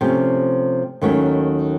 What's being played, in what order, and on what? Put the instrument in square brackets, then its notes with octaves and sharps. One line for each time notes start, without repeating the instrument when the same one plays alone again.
[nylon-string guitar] C3 F3 A3 C#4
D#2 D#3 F#3 A3 C#4